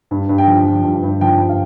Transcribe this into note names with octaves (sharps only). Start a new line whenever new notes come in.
G2
G2
G5
F3
F3
G2
G2
F3 G5
G2
F5